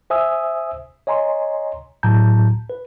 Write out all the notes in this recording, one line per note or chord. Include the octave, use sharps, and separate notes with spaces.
C5 E5 G#5 D#6 E6
C#5 D#5 G#5 A#5 C6
A2 F#3 A5 A#5 G6
B4